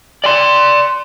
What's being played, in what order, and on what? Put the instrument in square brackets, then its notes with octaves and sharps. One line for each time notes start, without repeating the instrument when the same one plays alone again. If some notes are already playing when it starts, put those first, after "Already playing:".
[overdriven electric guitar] D5 C6